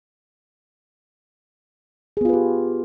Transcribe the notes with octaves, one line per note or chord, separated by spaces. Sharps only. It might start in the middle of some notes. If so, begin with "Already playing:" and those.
B3 F4 G4 G#4 B4